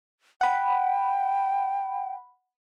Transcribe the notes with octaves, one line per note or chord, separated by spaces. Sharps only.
F#5 G5 B5